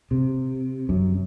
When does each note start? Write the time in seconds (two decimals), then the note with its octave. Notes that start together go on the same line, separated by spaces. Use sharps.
0.11 C3
0.89 F#2